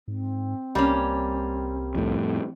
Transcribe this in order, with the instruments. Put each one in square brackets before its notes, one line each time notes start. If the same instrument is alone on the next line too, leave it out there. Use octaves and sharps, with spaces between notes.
[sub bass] G#2 [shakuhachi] C4
[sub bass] C2 [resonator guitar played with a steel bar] G3 A#3 C#4
[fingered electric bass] F2 A2